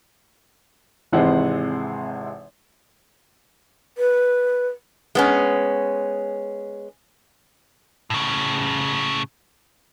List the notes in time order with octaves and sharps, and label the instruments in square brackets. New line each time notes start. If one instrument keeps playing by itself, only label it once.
[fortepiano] G#1 C3 E3 G#3 C5 F#5
[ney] B4
[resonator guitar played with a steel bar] G#3 B3 C#4
[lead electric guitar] A2 C#3